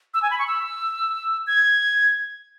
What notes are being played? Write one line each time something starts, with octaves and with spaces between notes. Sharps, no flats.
E6
G#5
B5
C#6
E6
G#6